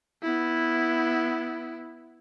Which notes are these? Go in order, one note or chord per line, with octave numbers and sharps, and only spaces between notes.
B3 E4